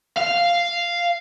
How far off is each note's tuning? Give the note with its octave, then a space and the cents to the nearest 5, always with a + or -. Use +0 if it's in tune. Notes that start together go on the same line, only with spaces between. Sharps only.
F5 -5